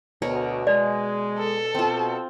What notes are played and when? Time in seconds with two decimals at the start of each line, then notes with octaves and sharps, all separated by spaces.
0.22 D2 B2 A#4 C#5
0.67 G#3 D5
1.39 A4
1.75 B2 C4 F4